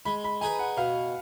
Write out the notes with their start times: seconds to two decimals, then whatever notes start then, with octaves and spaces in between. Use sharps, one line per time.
0.05 G#3 B5
0.24 B5
0.41 D#4 G#4 B4 G#5
0.59 F#5
0.77 B2 F5